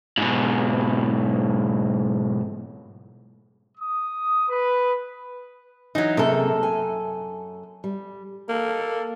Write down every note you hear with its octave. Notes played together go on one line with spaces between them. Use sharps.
G#2 B2
D#6
B4
E3 F#3 D#4
F#2 C3 A#3 G#4 A4
G#5
G3
A#3 A4